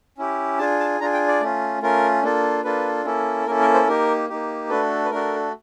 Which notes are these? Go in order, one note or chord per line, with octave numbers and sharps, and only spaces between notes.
C#4 E4 G4
D4 F4 G#4 A5
A5
D4 F4 G#4 A#5
G5
D5
A3 C#4 F4
A3 C#4 F4 A#4
A#3 D4 F4 A4
A#3 D4 F4 A4 B4
A#3 C#4 E4 A4
A#3 C#4 E4 A4 A#4
A#4
C5
A#3 D#4 G4 A#4
A#3 D#4 G4
A3 D4 F#4 A4 B4
B4
A3 D4 F#4 A4 A#4